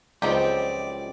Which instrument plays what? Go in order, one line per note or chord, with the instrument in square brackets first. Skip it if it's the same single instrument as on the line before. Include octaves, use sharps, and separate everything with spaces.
[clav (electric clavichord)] C#2 [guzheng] F3 F#3 [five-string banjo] C4 D#4 G4 [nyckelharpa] D5